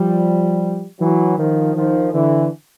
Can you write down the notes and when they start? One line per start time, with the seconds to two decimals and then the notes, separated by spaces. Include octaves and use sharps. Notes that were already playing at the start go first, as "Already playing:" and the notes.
Already playing: F3 G3
1.00 E3 F#3
1.38 D#3 F3
1.75 D#3 F3
2.13 D3 E3